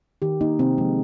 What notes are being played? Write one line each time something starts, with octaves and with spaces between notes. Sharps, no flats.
D#3 G4
A#3 D#4
C3 C4
F3 G#3